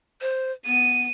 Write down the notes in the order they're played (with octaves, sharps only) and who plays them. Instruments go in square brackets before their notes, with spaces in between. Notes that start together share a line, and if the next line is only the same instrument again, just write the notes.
[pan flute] C5
[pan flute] B3 [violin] D#7